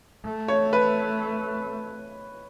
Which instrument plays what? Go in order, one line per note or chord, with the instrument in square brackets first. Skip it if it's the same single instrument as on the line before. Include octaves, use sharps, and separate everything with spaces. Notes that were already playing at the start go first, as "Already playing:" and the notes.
[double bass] A3
[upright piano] C#5
B4